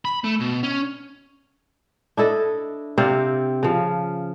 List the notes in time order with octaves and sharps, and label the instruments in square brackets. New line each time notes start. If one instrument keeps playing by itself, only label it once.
[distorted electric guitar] B5
A3
B2
C#4
[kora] D4 E4 A4 D#5
C3 C4 D5 F5
C#3 F3